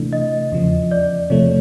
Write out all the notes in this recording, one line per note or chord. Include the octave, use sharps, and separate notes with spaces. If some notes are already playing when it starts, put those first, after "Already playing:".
Already playing: C3 E3 A3 D4
D#5
E2 C#3 F3
D5
C3 F3 A3 C#5